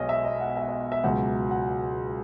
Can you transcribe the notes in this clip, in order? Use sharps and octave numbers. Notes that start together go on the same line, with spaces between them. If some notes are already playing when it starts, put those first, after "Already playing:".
Already playing: B1 B2 G#3 C#5 D#5
E5
D#5
F#5
E5
D#5
E5
C#2 B2 F#3 F#5
F#5